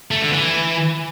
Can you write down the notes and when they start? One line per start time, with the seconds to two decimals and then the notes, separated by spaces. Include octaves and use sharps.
0.11 A3
0.22 D3
0.32 E3